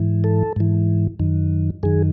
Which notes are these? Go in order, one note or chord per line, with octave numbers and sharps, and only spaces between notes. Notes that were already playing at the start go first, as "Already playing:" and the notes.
Already playing: G#2 E3
A4
G#2 E3
F#2 D#3
F#2 D#3 G#4